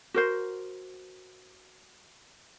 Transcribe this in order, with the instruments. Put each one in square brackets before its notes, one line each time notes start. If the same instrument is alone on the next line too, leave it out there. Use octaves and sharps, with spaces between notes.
[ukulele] F#4 A#4 C5